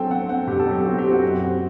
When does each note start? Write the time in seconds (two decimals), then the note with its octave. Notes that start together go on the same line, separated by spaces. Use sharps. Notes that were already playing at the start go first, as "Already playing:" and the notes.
Already playing: F#3 C4 A4 G5
0.10 C4 F#5
0.29 C4 F#5
0.47 B2 G4
0.59 A4
0.67 F#3 G4
0.85 C4 F#4
0.98 G4
1.04 C4
1.12 F#4
1.22 F#2
1.42 C4